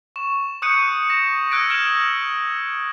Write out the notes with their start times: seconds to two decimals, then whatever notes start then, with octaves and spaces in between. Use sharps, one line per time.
0.16 C#6 E7
0.62 C#6 D#6 F#6 G6 C#7 D#7
1.10 A#6 E7
1.51 D#6 E6 F#6 G#6 A#6 D7
1.69 F6 G#6 E7 F#7